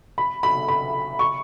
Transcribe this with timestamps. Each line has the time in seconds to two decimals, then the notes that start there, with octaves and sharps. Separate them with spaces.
0.18 B5
0.43 B5
0.68 B5
1.19 C#6